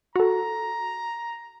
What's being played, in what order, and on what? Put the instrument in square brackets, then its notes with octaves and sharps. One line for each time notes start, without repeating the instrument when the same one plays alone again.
[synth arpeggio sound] F#4 A4 [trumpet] A#5